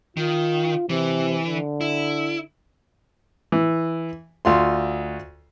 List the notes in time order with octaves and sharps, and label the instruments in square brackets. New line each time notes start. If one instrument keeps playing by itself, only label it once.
[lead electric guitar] D#3 [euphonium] F4
[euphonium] C3 [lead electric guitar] E3
[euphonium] D3
[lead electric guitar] E4
[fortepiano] E3
D2 F4 C6